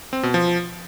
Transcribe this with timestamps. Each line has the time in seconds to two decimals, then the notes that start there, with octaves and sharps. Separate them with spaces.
0.13 C4
0.23 B2
0.34 F3